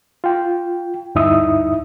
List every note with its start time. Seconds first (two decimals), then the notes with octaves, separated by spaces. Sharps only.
0.24 F4 G5
1.15 D2 G2 D#4 E4 E5 D#6